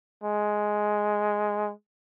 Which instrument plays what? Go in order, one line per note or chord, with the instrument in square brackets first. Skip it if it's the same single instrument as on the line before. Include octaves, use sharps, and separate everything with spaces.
[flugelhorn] G#3